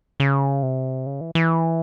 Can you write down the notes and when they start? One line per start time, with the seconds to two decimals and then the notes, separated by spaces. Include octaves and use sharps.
0.20 C#3
0.63 C3
1.06 C#3
1.21 E3
1.35 E3